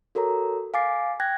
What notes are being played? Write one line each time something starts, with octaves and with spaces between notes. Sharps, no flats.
F#4 A4 A#4 C#5 A#5
F5 G#5 D6 A6 C7
G5 F#6 G#6 A#6